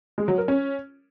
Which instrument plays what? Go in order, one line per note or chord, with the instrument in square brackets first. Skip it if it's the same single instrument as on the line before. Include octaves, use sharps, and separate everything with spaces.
[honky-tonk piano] G#3
F#3
A#4
C#4